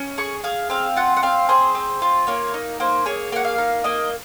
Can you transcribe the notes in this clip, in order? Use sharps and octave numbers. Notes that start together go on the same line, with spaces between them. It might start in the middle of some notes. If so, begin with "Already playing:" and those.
Already playing: C#4
G#4 C#6
G#4 F5
C4 F5
F4 F#5
F#5
C4 F5
G#4 C5
C4
F4
A#3 C#5
D#4
A#3 C5
G#4 C#5
A#3 F#5
F5
D#4
A#3 D#5